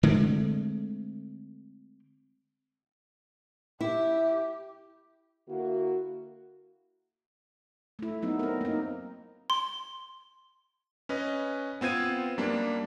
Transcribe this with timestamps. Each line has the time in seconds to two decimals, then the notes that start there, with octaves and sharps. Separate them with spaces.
0.03 D3 G#3 A3 C4
3.81 E4 G4 E5
5.48 D3 A#3 E4 F#4
7.99 A3 E4
8.22 F#3 B3 D#4
8.39 C4 A#4
8.61 A#3 D#4
9.50 C6
11.09 C#4 B4 D#5
11.81 B3 C4 F4 G#6 D#7
12.38 F#2 G3 A#3 D4